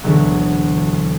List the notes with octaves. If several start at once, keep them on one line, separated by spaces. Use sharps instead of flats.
D2 B2 D3 E3 F#3 B3